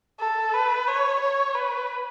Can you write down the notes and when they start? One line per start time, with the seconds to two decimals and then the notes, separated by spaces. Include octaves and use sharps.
0.20 A4
0.54 B4
0.88 C#5
1.21 C#5
1.54 B4